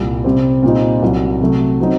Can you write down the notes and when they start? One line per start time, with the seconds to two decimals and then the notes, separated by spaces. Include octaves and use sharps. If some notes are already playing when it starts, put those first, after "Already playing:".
Already playing: C2 A#2 G3
0.24 C3 G3 C4
0.63 A#2 G3 C4 D#4
1.02 C2 C3 F#3
1.41 C3 F#3 A3
1.80 F#3 C4 D#4